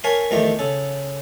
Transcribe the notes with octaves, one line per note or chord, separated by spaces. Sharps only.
A#4 C#5 F5 G#5 A5 B5
E2 D#3 F3 A3 G4 A#5
C#3 A4